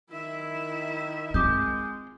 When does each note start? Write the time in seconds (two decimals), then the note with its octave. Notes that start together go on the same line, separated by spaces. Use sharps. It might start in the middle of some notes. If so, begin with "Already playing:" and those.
0.11 D#3 E4 E5
1.34 G#3 C4 F4 D6 D#6 G6